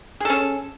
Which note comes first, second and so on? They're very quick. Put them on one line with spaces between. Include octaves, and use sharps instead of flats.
G#4 A4 C#4